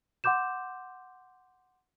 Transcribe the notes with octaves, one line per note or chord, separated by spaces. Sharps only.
F#5 C6 D6 G6 E7